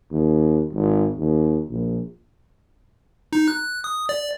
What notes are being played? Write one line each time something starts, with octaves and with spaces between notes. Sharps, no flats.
D#2
G#1
D#2
A#1
D#4
F#6
D#6
D5